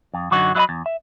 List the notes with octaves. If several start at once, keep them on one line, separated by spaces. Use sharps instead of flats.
F2
F#2 D3 F#3 D#4 F#4
F#3 E4 F4 D#5 B5
E2
E5